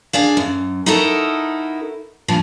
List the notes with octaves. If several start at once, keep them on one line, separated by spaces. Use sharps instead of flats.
D4 G#4 D5 F5
F#2
D#4 E4 F#4 A4 A#4
G2 A#2 F3